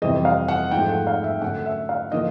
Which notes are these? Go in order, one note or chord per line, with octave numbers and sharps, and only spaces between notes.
F2 C3 E3 G3 C4 D#5
F5
F#5
G#2 F3 A3 G5
F#5
F5
E5
F#2 D3 F#3 A3 C#4 F#5
E5
F5
D3 F3 A#3 D#5